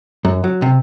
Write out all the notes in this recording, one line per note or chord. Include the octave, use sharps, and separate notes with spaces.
F#2
F#3
C3